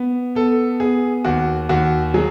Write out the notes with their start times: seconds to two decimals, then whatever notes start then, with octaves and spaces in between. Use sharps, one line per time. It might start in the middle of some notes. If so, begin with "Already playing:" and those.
Already playing: B3
0.35 B3 A4
0.80 B3 G#4
1.25 D#2 F#4
1.69 D#2 F#4
2.14 F#3 G#4